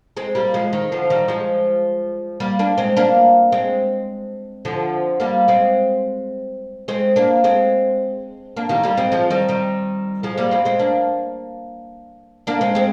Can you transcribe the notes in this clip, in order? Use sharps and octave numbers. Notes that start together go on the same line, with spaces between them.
G#3 C4
G3 A#3
F3 G#3
D#3
D3 F3
D#3 G3
F3 G#3
G3 A#3
A#3 D4
G#3 C4
A#3 D4
G#3 C4
D3 F3
G3 A#3
G#3 C4
G#3 C4
A#3 D4
G#3 C4
A#3 D4
D#3 G3
G3 A#3
G#3 C4
F3 G#3
D#3 G3
D#3 G3
F3 G#3
G3 A#3
G#3 C4
G#3 C4
A#3 D4
A#3 D4
G#3 C4
G#3 C4